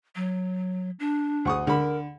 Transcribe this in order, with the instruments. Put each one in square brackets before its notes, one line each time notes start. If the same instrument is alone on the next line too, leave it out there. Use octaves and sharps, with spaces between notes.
[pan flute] F#3
D4
[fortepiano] D2 C#6 D#6
[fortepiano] D3 B5 [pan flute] A#4